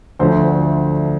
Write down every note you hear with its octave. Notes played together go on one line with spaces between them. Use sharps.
D2 D3 F3 A3 C5